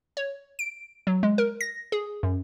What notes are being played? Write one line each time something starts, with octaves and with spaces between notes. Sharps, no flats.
C#5
D7
F#3
G#3
A#4
A#6
G#4
F#2